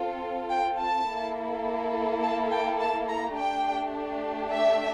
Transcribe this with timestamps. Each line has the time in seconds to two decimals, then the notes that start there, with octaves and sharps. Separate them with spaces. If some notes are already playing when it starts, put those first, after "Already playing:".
Already playing: C4 F4 A4
0.52 G5
0.80 A5
1.09 A#3 E4 A4
2.23 A5
2.51 G5
2.80 A5
3.09 A#5
3.37 A3 D4 G4 G5
4.51 E5